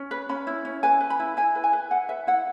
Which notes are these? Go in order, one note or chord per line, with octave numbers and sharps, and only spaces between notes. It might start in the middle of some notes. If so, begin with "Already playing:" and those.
Already playing: C#4
B4
C#4 B5
E4
C#4
B4 G#5
B4
B5
E4
E4 G#5
B4
G#5
B4
B4 F#5
B4 E5
E4 F#5